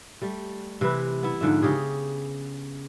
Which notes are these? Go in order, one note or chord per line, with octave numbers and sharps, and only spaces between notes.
G3 A3
C3 E3 E4 B4
B3 E4
G#2 D3 F3 E5
C#3 G4 G#4